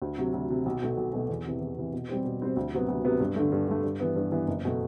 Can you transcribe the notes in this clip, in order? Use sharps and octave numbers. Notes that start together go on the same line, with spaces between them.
D2
C3 F#3
D2
C3 F#3
B1
B2 A3
B1
B2 A3
E2
C3 E3
E2
C3 E3
B2
G3 C4 G4 C5
B2
G3 C4 G4 C5
D2
C3 F#3 B3
D2
C3 F#3 B3
G2
D3 A3
G2
D3 A3
G2
E3 B3
G2
E3 B3
F#1
B2 A3